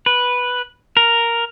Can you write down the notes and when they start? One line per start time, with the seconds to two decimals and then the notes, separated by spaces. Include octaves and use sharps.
0.06 B4
0.97 A#4